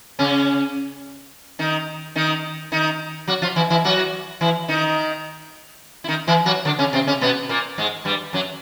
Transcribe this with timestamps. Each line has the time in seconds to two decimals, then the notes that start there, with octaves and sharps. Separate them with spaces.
0.19 C#3 C#4
1.59 D#3 D#4
2.16 D#3 D#4
2.72 D#3 D#4
3.28 F#3 F#4
3.42 F3 F4
3.56 E3 E4
3.70 E3 E4
3.84 F#3 F#4
4.41 E3 E4
4.68 D#3 D#4
6.04 E4
6.08 D#3 D#4
6.27 E3 E4
6.46 F#3 F#4
6.65 D3 D4
6.79 C#3 C#4
6.93 C3 C4
7.07 C#3 C#4
7.21 B2 B3
7.49 A#2 A#3
7.78 G#2 G#3
8.05 G2 G3
8.33 F#2 F#3